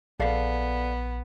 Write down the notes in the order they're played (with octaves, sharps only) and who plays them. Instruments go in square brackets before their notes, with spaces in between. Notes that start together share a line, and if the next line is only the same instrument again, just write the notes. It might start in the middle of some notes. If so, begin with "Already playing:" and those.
[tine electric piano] A#1 [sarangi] B3 [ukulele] A4 D5 F5